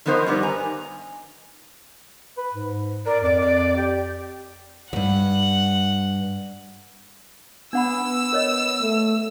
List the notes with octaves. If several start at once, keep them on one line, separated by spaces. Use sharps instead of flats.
D#3 F3 B3 A#4 C5 D#5
G2 G3 B3 D#4
G#5 A#5
B4
G#2
A#4 D5
F2 D5
D5
G4
E2 G2 F#5
B3 D4 F#5 B5 E6
A#4 C#5 D#5
A3